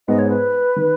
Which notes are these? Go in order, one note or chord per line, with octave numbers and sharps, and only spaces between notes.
G#2 G#3 B3 D#5
C#5
B4
D#3